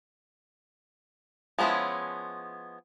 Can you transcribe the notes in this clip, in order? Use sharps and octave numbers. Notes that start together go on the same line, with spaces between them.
F3 G#3 B3 C#4 E4